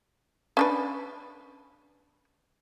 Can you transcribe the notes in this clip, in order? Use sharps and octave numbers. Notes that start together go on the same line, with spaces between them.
C#4 D4 B4